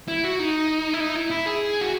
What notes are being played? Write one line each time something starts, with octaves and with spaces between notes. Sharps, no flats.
E4
F#4
D#4
E4
D#4
E4
E4
G#4
F#4